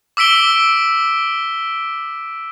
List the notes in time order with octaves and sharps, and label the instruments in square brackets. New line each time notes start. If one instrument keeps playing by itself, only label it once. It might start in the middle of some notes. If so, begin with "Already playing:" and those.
[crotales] D6 E6 B6 D7 G7